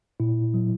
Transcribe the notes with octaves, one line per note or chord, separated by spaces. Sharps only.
A#2 E4
F#3